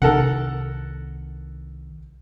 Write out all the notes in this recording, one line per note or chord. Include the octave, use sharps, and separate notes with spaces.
C2 C3 D#3 A4 A#4 F#5